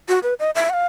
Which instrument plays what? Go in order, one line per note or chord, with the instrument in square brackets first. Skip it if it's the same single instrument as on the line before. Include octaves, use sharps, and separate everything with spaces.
[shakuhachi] F#4
B4
D#5
E5
F#5
F5